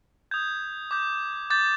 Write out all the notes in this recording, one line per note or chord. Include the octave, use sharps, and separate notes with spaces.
D#6 G6 G#6
D6 G6
D6 G6 A6